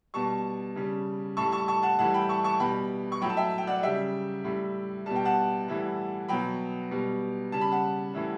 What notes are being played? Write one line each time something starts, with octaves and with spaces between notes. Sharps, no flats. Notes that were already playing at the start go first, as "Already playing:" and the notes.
B2 G3 A5 C#6
C#3 G3
A2 G3 A5 C#6
A5 C#6
A5 C#6
F#5 A5
A2 E3 G3 F#5 A5
G5 B5
A5 C#6
A5 C#6
B2 G3 G5 B5
C#6
A2 F#3 G5 B5
A5
E5 G5
G5
D5 F#5
C#3 G3 E5 G5
A2 G3
B2 G3 A5
G5
F#5 A5
A2 E3 G3
B2 F#3 G5 B5
B2 G3
C#3 G3 A5
B5
F#5 A5
A2 E3 G3